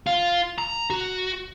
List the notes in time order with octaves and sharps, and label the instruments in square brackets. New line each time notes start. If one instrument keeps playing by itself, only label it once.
[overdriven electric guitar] F4
A#5
F#4